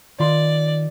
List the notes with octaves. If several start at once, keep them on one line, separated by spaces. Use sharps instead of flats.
D#3 F4 D5 C6